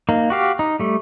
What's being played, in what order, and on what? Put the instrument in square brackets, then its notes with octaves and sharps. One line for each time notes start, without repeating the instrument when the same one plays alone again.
[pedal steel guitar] A#3 D#4
F#4 G4 F5
D#4
G3 A3